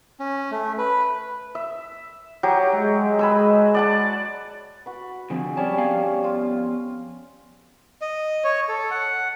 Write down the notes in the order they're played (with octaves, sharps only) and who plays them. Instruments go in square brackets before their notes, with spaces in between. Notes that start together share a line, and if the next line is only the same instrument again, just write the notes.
[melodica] C#4
A3
B4
[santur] E5
F#3 G4
[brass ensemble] G#3
[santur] B4 G#5 E6
D5 F#5 A5
[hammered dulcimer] F#4 B4
[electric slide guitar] D3 F3 C4 [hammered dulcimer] G#4
[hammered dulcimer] G3 C#4 [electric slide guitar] C#5 A5
[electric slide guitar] F2 B3 F5
[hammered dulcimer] F4
[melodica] D#5
C#5
A4
F#5